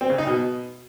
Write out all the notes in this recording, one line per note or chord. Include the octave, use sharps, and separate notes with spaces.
C4
C#3
D#4
B2